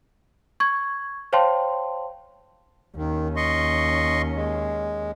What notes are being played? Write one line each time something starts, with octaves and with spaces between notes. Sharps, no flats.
C#6 G#6
C5 C#5 F5 G5 A5 C6
D#2 D#3 C#4
D#5 C6 C#6
G#3